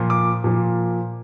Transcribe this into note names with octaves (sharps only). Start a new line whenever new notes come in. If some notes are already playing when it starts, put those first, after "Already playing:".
Already playing: A#2 F3
D6
A#2 F3